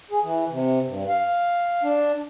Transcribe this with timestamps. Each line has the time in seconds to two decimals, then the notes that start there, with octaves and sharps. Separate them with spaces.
0.11 G#4
0.23 E3
0.51 C3
0.86 G2
1.09 F5
1.83 D4